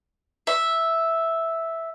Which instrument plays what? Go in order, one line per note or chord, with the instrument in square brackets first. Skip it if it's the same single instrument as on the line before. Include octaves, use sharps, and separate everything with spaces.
[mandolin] E5